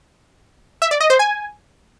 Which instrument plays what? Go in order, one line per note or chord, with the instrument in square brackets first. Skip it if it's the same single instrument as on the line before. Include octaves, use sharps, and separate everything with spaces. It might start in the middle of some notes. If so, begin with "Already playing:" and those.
[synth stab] E5
D5
D#5
C5
G#5